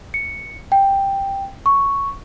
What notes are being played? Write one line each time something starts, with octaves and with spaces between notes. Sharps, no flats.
C#7
G5
C#6